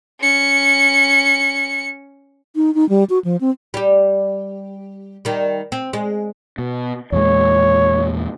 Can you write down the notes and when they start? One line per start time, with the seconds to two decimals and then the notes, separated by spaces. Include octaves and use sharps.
0.21 C#4 C#7
2.56 D#4
2.75 D#4
2.89 G3
3.10 F#4
3.25 F3
3.41 C4
3.74 G3 G4
5.25 D#3 G3
5.72 C4
5.93 G#3
6.58 B2
7.12 E2 A#2 G#3 C#5